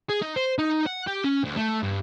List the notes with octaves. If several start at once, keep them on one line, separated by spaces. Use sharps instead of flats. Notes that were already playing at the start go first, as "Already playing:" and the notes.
G#4
D#4
C5
D#4
F#5
G4
C#4
D2
A3
G2